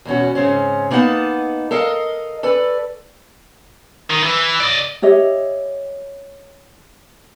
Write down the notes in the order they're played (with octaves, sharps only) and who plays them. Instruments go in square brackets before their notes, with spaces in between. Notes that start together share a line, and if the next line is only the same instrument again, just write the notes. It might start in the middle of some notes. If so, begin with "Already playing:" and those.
[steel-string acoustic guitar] E2 B2 C#4 F#4
G#2 C#3 C4 C#4
A#3 B3 D#4 C5 F#5 A5
A4 A#4 D#5 F5
A4 B4 D5
[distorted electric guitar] D#3
E3
D5 D#5
[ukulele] G4 C#5 D#5 E5